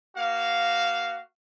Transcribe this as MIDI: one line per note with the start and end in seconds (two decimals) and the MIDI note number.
0.17 1.21 58
0.17 1.21 66
0.17 1.21 77